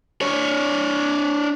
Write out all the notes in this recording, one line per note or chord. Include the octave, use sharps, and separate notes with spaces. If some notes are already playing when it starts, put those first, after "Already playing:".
D4 C#5